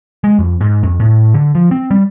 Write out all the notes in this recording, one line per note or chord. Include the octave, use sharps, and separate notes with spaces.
G#3
F2
G#2
F2
A2
D3
F3
C4
G3